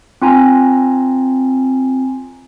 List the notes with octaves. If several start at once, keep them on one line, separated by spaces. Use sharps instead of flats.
C4 F4 G#5 A#5